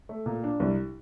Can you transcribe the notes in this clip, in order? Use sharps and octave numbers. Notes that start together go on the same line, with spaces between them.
A3
A#2
D4
C2